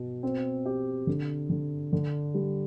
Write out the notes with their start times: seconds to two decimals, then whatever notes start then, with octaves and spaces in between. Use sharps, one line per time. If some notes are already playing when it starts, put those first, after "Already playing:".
Already playing: B2
0.23 C4
0.66 G4
1.07 D3
1.49 D3
1.93 D3
2.34 G3